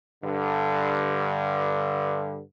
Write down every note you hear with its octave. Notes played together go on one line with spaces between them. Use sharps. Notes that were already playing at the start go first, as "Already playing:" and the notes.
G2 D3